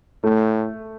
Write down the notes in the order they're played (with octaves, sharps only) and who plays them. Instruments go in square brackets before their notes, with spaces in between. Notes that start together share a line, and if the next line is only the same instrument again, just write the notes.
[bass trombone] A2 [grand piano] A3